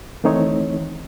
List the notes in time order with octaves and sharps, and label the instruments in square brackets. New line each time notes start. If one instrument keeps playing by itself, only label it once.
[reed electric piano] D#3 E3 A3 C4 D#4 C#5